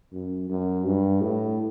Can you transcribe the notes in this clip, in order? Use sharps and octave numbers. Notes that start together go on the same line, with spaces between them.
F#2
F#2
G2
A2